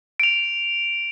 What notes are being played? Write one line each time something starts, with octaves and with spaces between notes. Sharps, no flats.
D7 F7